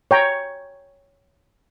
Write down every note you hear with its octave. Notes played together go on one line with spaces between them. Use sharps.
C#5 G5 A#5